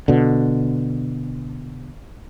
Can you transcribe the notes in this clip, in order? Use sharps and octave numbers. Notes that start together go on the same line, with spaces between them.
B2 D3